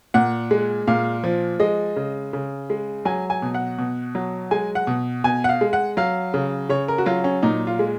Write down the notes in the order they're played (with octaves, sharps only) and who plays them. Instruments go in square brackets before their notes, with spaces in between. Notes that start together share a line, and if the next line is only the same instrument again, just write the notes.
[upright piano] A#2 F#5
G#3
A#2 F5
F3
G#3 D#5
C#3
C#3
G#3
F#3 G#5
G#5
B2
F#5
B2
F#3
G#3 G#5
F#5
B2
B2 G#5
F#5
F5
G#3
F#5
F#3 F5
C#3
C#3 C#5
A#4
F#4
F#3 F4
C#4
A#2 D#4
F4
G#3